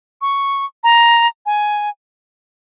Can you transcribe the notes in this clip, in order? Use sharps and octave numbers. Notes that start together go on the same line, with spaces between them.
C#6
A#5
G#5